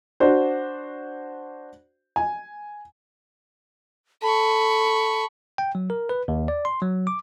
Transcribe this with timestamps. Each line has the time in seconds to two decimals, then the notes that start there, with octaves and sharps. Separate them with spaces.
0.20 D4 F#4 C5
2.16 G#5
4.22 A4 A5 B5 C#6
5.58 G5
5.75 F#3
5.90 A#4
6.09 B4
6.28 D#2
6.48 D5
6.65 C6
6.82 F#3
7.07 D6